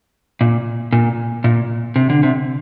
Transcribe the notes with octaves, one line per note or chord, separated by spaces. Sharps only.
A#2
A#2
A#2
C3
D3
C3